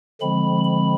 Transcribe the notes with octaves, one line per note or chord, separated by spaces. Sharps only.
D3 F3 G#3 C4 B5
B5